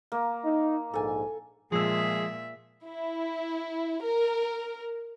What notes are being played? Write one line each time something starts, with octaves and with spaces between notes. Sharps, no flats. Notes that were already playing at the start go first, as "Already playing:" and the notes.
A#3
D#4
A#1 G#2 A4 G#5
A#2 F3 G#3 G#4 E5 E6
E4
A#4